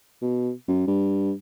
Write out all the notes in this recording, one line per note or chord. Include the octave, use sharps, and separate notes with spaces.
B2
F#2
G2